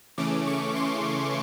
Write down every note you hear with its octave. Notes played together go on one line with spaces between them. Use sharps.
C#3 E3 A3 C#4 D6
C#6
C6